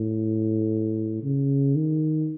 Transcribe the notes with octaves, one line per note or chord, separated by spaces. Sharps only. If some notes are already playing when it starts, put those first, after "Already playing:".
Already playing: A2
C#3
D#3